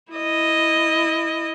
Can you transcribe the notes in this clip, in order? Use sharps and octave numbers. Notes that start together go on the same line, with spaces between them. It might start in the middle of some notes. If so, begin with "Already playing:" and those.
E4 D#5